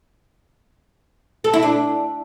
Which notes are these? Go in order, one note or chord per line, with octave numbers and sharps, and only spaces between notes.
A4
E4
D4